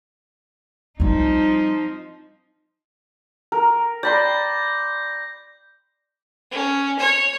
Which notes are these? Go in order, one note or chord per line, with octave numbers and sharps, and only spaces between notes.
F3 G3 C4 D#4
A#4
D5 B5 C6 G6 A#6
C#4
C#5